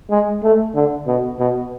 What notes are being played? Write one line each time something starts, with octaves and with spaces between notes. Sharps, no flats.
G#3
A3
D3
B2
B2